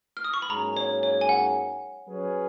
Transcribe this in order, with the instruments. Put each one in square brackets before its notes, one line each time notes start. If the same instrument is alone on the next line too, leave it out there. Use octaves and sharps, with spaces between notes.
[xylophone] F6
D#6
C#6
B5
[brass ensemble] G#2 F#3 A#3 C#4 G#4 [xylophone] A#5
[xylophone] C#5
C#5
G#5
F#5
[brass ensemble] F#3 C#4 G#4 B4